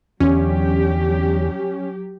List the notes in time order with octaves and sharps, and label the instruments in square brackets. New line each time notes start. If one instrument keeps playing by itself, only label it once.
[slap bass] E2 D3 [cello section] F#3 G4 [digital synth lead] C#4